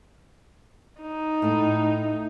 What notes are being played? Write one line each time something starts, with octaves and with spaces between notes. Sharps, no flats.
D#4
A2 A3